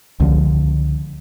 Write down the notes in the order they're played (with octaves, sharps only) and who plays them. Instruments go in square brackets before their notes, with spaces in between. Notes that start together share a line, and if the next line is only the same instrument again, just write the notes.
[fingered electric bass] C#2 D3 F3